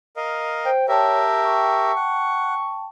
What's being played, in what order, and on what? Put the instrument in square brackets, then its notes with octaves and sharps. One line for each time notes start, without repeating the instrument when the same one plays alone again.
[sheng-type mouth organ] A#4 D#5 F5
[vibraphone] C5 [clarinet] G5
[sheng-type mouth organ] G4 A#4 E5 [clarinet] C#5 [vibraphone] G5 A5
[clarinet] C#6
[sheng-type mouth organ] F#5